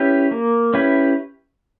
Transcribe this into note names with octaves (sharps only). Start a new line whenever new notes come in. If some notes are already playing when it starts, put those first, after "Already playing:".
Already playing: C#4 E4 G4 B4
A#3
C#4 E4 G4 B4